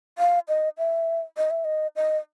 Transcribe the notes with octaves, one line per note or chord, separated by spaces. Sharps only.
F5
D#5
E5
D#5
E5
D#5
D#5